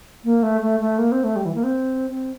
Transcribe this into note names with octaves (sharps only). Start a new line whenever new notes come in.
A#3
A3
A3
A3
A#3
C4
A3
G3
E3
A#3
C4
C4